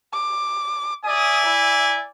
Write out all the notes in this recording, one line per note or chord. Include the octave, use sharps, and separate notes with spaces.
D6
D5 E5 G#5 D#6
E4